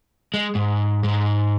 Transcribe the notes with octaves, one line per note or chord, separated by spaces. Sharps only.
G#3
G#2
G#2